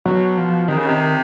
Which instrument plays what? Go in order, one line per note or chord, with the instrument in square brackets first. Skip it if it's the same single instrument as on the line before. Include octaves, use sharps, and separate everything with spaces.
[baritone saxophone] B2 [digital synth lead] F#3
[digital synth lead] F3
[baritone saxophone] C3 [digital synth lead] D#3
[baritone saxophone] C#3
[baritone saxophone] C3 [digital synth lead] D#3